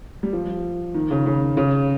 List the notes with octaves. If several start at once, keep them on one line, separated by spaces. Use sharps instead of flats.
G3
F3
D#3
C#3
C#3
C#3